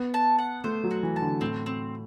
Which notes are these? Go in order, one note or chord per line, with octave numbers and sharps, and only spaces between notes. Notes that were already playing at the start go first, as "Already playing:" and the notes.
Already playing: B3
A5
F#5
A3 C5
F#3
F#4
E3
A5
D3
A2 C4
C4